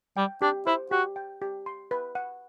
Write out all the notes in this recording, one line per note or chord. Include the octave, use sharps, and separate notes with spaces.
G3 G5
D4 G4
E4 C5
F#4 G4
G5
G4
C6
B4
F#5